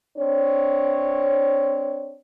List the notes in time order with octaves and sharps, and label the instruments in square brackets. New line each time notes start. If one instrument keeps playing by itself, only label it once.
[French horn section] C4 D4 C#5